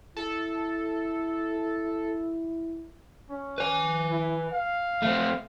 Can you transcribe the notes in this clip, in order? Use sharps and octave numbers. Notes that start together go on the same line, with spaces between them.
E4 A4
C#4
B4 G#5
E4
F5
A3 C4